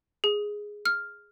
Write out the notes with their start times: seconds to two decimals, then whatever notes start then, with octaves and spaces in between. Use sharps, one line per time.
0.24 G#4
0.85 F6